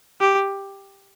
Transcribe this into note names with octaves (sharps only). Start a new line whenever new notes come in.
G4